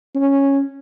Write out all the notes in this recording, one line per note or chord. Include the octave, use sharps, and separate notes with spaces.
C#4